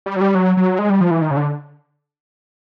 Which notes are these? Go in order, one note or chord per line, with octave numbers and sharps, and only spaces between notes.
G3
F#3
G3
F#3
F#3
G#3
G3
F3
E3
D#3
C#3
D3